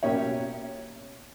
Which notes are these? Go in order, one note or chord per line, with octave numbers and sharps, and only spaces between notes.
B2 A#3 C#4 G4 C#5